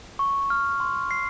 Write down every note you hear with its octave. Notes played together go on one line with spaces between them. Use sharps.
C#6
F6
C6
C7